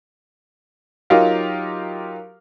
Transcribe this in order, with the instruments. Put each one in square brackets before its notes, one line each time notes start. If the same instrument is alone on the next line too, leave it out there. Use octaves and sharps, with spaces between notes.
[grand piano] F#3 D#4 F4 G4 A#4 F5